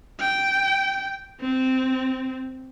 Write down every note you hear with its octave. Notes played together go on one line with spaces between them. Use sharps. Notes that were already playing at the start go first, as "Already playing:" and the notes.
G5
C4